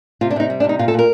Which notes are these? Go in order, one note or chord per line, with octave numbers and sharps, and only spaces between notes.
C3 F4
D4
C3 D#4
G3
D4
C3
D#4
A#2 F4
A4
A#2
A#4